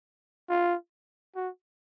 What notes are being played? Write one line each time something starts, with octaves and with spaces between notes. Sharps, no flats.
F4
F#4